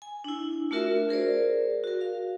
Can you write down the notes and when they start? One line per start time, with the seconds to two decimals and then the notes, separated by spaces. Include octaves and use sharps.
0.02 G#5
0.24 D4 E4
0.71 A3 D4 F4 F#4 A#4 E5
1.09 G#4 A#4 C5 D5
1.84 F#4 A#4
2.01 F5